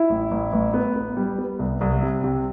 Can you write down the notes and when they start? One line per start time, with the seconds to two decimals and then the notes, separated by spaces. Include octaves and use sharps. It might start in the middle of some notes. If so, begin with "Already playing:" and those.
Already playing: E4
0.10 A1
0.31 A1
0.53 A1
0.74 B3
0.96 B3
1.17 G3
1.38 B3
1.59 C2
1.81 C2
2.02 C3
2.24 C3